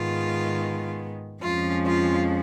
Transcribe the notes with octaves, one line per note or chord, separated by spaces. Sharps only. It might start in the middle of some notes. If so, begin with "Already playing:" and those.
Already playing: G#2 D#3 G#3 B3 F4
F2 F3 G#3 C#4 F4
F4